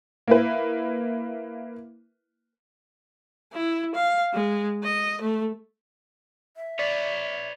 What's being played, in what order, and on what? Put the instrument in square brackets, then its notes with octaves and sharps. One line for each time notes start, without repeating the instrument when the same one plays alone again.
[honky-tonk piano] A#3 E4 B4
[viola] E4
F5
G#3
D#5
A3
[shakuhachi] E5
[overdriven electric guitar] B4 C#5 [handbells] D5